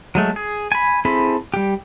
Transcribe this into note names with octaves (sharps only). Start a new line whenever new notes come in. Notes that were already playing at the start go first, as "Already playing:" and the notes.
F#3 G#3 A3
G#4
G#5 B5
C4 E4 G#4 A4 B5
G3 G4